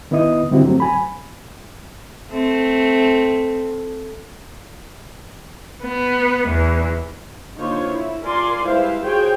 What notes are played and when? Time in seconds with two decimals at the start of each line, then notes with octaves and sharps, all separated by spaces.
0.11 D#3 B3 E4 D#5 D#6
0.51 D3 G3 C4 E4 F#4 G4
0.66 F#3 A3 C4
0.80 G#5 B5
2.30 A3 C4
5.84 B3
6.49 E2
7.57 D3 A#3 D#4 F4 C5 C#5
7.89 E4
8.22 F4 A#4 D5 G#5 C6
8.65 G3 G#3 E4 B4 C5 F5
9.03 F4 F#4 G#4 C5 C#5 G5